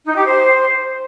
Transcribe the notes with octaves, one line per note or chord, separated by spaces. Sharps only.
D#4
G4
C5